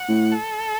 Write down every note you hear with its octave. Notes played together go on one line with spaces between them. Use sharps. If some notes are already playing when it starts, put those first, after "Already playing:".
Already playing: F#5
A2
A4